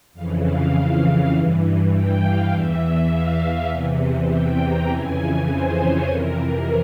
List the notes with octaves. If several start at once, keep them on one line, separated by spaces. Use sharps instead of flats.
F2 C#3 E3 F5
F5
G2 E3
G5
F5
E2 E3 E5
F5
E2 C3 E3
G5
A#5
F2 C#3 E3 G#5
C5
C#5
F2 C3 E3 A#4